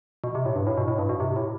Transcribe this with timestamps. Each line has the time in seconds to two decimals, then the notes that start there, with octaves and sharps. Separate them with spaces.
0.24 B2
0.35 C3
0.45 A2
0.56 G2
0.67 A2
0.77 B2
0.88 A2
0.98 G2
1.09 B2
1.20 C3
1.36 A2